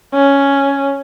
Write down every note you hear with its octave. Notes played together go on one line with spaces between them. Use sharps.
C#4